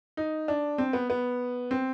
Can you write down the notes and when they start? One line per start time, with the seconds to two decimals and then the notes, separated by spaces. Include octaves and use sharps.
0.17 D#4
0.48 D4
0.78 C4
0.93 B3
1.10 B3
1.71 C4